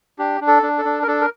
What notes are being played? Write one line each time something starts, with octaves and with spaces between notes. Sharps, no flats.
D4 G4
D4
A4
D4
A4
D4
A#4
D4 A4
A#4